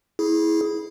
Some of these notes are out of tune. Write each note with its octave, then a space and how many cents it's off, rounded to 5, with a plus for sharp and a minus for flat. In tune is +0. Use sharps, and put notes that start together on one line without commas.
E4 -15 G#4 +10